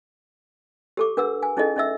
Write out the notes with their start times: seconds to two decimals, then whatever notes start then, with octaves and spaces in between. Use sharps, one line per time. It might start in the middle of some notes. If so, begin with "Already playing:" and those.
0.97 G4 A4 D6
1.17 D4 A#4 B4 F#5 E6
1.43 G#5
1.57 C#4 D#4 E4 G#4 A4 D#5
1.76 C#4 D#4 D#5 E5 E6